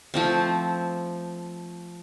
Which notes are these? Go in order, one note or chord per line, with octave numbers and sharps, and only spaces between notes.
F3 A3 C4